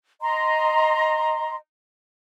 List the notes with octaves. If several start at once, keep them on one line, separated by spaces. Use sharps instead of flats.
D#5 A#5 C6